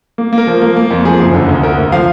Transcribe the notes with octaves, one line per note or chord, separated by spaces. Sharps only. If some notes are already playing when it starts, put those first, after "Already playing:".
A#3
A#3
A#4
F3
A#3
A#3
F2
F3 G#4
F#1
D3
D2
D2 A#4
D2
F3 F5